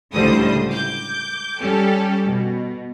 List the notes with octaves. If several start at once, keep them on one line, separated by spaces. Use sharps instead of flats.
C#2 A2 D3 G3 C5 D#6
D6 G6
G3 C#4 G4 A4
B2